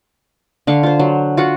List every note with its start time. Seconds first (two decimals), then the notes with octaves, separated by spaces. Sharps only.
0.67 D3 F5 C#6
0.83 F4 C5
0.99 F#3
1.37 F4 F#4 F#5